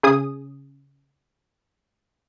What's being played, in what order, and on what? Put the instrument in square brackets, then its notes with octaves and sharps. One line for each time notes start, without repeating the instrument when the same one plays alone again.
[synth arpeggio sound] C#3 G#4 D#6